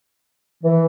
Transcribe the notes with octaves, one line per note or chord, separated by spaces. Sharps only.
E3